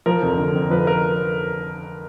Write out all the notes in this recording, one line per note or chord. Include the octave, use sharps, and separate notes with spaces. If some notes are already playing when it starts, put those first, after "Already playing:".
F3 A#4
F1
D3
F2
F3 B4
A#4